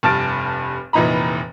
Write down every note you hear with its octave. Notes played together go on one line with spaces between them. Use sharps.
F1 G2 A5 F6 A6 D7
F1 A#2 E3 D#4 A#5 B5